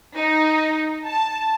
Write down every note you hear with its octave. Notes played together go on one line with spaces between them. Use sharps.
D#4
A5